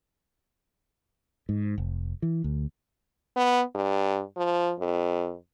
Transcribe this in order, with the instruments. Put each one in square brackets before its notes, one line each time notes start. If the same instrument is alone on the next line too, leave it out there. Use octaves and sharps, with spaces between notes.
[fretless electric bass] G#2
F1
E3
D2
[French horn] B3
G2
F3
F2